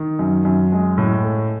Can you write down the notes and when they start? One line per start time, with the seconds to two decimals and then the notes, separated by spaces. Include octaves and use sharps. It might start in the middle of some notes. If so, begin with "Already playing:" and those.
Already playing: D#3
0.19 F#2
0.45 F#2
0.72 G#3
0.98 A2
1.24 A3